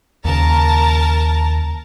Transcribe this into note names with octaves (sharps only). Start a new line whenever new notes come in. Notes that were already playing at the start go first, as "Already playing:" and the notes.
D#2 C#3 A#4 A5 A#5